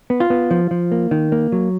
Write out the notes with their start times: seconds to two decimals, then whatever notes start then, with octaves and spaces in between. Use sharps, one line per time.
0.10 B3
0.20 F4
0.30 B3
0.51 F3
0.71 F3
0.92 A#3
1.11 D#3
1.32 A#3
1.52 F#3